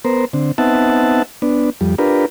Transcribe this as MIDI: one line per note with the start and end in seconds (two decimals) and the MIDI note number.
0.05 0.25 59
0.05 0.25 70
0.05 0.25 72
0.33 0.52 50
0.33 0.52 60
0.58 1.22 59
0.58 1.22 60
0.58 1.22 63
0.58 1.22 76
0.58 1.22 78
0.58 1.22 81
1.42 1.70 59
1.42 1.70 62
1.81 1.95 41
1.81 1.95 55
1.98 2.26 62
1.98 2.26 65
1.98 2.26 67
1.98 2.26 70
1.98 2.26 71